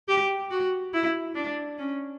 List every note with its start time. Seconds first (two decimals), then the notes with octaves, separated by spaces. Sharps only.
0.08 G4
0.51 F#4
0.93 E4
1.35 D4
1.78 C#4